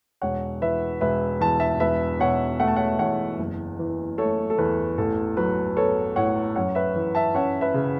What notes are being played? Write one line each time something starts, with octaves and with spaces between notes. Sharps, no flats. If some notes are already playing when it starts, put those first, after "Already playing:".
E1 C#5 F#5
E3 B4 E5
E1 B4 E5
E2 A5
E5 A5
E1 B4 E5
B2 C#5 F#5
A3 F#5
A5
C#5 F#5
E2 C#5 F#5
F#1
E3
A3 A4 C#5
A4
E2 B4
A1 A4
F#3 B4
B3 A4 C#5
A2 C#5 F#5
F#2 C#5 F#5
B4 E5
E3
E5 A5
C#4 C#5 F#5
B4 E5
C#3